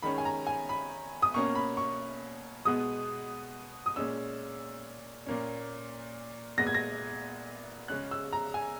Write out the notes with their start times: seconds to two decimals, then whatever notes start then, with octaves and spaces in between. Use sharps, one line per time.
0.03 D#3 G#3 C#4 B5
0.18 G#5
0.25 A#5
0.47 G#5
0.69 B5
1.22 D#6
1.34 B2 A#3 C#4 C#6
1.55 B5
1.77 C#6
2.65 B2 G#3 B3 D#6
3.86 D#6
3.96 A#2 G#3 C#4 E6
5.26 A#2 A#3 C#4
6.58 A#2 G#3 B3 A#6
6.67 G#6
6.75 A#6
7.88 C#3 G#3 C#4 F#6
8.11 E6
8.33 A#5
8.54 G#5